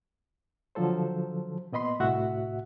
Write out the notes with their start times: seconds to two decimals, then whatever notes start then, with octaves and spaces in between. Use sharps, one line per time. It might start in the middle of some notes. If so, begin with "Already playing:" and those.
0.75 D3 F3 F#3 A4 C5
1.72 A#2 B3 D#5 B5 C6
2.00 C2 A2 F#4 E5 F#5